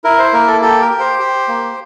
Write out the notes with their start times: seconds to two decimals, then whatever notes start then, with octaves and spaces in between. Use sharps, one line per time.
0.04 E4 A#4
0.19 C5
0.33 A#3 A#4
0.47 A4
0.62 G4 A4
0.82 A#4
0.91 G4
0.99 C5
1.19 G4
1.48 A#3